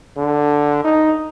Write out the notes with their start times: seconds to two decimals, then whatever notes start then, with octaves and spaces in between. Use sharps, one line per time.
0.17 D3
0.84 D#4